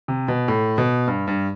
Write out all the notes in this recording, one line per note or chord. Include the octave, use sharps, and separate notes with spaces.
C3
B2
A2
B2
G2
G2